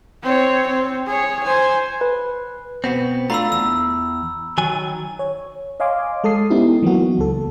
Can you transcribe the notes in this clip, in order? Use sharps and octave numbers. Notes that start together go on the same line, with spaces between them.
C4 C#5
C4
G#4 C#5
C5 G#5
B4
B2 B3 C4
A3 D4 F4 A#5 B5 E6
E2 E6
D#3 F#3 G#5
C#5
C#5 D#5 F5 G#5 C6 D6
G#3 A4 A5 D#6 C7
B3 C#4 D#4 E4 G4
E3 F#3 A#3 B3 F#4
C#2 A4